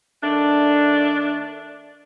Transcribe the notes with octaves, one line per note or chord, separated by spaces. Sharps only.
D#3 A3 D4